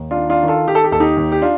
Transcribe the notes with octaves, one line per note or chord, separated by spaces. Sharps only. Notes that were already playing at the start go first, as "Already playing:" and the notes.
Already playing: D#2
D4 F4
D#3
D4 F4
D#3
F4 A4
D#3 G4
A4
G4
D#2 A4
D#4 G4
D#2
G4
D4 F4